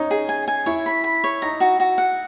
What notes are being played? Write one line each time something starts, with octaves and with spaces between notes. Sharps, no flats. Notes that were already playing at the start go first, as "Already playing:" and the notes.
Already playing: C#4 D#4
G#4
G#5
G#5
E4 C#5
B5
B5
C#5
D#4 A#5
F#4
F#4
F#5